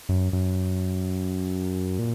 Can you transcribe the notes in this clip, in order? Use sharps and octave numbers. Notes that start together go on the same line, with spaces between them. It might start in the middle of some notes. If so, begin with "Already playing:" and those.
F#2
F#2
A#2